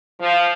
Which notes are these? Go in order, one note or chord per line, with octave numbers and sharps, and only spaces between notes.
F3